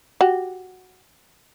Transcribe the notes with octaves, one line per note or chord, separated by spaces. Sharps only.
F#4 G4